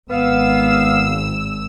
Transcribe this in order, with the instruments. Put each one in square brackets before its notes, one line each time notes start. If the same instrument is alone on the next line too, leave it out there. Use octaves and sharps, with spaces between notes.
[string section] G#1 E6 [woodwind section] B3 F5